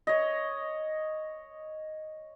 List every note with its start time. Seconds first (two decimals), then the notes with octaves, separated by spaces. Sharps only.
0.07 C#5 D#5